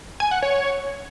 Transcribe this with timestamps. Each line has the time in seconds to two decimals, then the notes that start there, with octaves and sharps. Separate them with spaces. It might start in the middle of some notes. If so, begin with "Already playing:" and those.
0.20 G#5
0.31 F#5
0.42 C#5